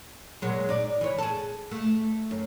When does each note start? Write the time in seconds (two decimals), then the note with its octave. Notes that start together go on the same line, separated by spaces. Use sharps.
0.42 A#2 F#3 G#3
0.69 D#4 D5
1.01 E3 C#5
1.18 G#4 A4
1.71 A3
2.31 F#2